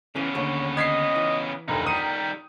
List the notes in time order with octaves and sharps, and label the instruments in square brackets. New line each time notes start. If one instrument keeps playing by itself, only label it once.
[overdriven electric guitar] C#3 B3 [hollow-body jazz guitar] E3 C#4
[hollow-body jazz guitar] D#2 D3 [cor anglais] C#5
[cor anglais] D#5 [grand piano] G#6 B6 C7
[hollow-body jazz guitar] E3
[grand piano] F1 D2 A2 [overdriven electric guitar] D#4 B4 [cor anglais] A#4
[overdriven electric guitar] D#3 G3 [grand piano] D#6 D#7